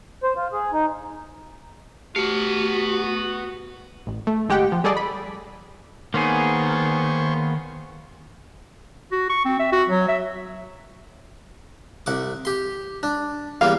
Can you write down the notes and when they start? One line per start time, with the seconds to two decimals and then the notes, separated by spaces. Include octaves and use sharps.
0.23 C5
0.36 F4
0.53 G#4
0.72 D#4
2.16 A3 B3 F#4 G4 F5
4.07 A1
4.27 A3
4.49 G1 G#3 G4 F#5 G5
4.72 F3
4.84 G3 G#4 A4 D5 D#5
4.97 B5
6.14 D#3 A#3 B3 G#4 C5 C#5
9.12 F#4
9.30 C#6
9.45 C4
9.60 E5
9.73 F#4
9.89 F#3
10.09 E5
12.06 C2 F#5 D6
12.45 G4 C6
13.03 D4
13.61 E2 G3 A#3 F5